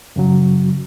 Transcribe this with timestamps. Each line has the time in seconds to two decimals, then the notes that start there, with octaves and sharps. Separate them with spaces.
0.16 F#2 C#3 F#3